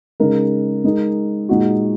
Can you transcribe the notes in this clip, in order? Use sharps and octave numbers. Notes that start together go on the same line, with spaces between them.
C#3 G#3 D#4 A#4
G#3 D#4 A#4
A#2 G#3 D#4 F#4